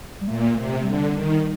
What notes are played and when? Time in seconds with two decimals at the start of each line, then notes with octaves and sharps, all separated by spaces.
0.21 G3
0.27 A#2 A3
0.42 A#3
0.55 C3 A3
0.80 A3
0.84 D3 G3
1.13 D#3